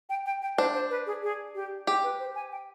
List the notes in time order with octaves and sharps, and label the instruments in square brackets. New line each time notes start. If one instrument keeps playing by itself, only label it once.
[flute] G5
G5
G5
[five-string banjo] D4 [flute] C5
[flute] C5
B4
G#4
G#4
G4
[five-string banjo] G4 [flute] G#4
[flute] B4
C5
G#5
G5